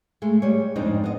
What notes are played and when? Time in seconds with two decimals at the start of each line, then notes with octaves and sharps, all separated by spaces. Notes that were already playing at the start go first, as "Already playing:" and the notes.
0.22 G#3 A3
0.42 G3 C#5
0.76 F2 G#2 C4 D4 D#4
1.04 B3 D#5